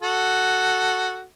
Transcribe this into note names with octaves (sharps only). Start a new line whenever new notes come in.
F#4 A4